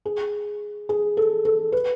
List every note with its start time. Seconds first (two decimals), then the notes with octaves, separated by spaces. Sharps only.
0.05 G#4
0.89 G#4
1.17 A4
1.45 A4
1.72 B4